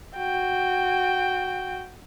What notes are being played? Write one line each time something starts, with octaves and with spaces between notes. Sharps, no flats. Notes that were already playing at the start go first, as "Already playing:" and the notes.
F#4 G5